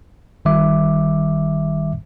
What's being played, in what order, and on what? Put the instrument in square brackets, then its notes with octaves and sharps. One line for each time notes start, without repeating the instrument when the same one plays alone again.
[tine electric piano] G1 D#3 G3 E5 D6